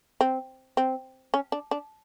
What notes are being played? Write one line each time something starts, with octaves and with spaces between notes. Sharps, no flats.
C4
C4
C#4
D4
D4